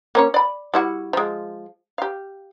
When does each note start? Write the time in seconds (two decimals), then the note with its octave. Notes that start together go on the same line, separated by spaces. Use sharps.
0.15 A#3 C#4 C#5
0.34 D5 B5
0.74 G3 E4 F#4
1.13 F3 G#3
1.98 G4 F5